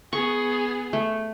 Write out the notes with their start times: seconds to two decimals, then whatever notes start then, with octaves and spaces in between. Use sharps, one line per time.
0.13 B3 G#4 C#6
0.93 A3